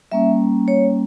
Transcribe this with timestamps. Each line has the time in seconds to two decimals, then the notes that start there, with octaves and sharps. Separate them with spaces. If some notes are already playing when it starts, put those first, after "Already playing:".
0.12 G3 A#3 C#4 E5
0.68 C#5